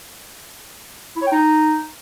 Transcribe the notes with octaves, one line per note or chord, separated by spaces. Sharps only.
E4
C#5
G5
D#4